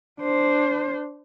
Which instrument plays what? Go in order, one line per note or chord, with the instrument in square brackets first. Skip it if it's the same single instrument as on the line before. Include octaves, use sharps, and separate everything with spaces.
[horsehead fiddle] D4 C5